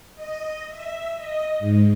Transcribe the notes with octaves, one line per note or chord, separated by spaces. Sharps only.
D#5
E5
D#5
G#2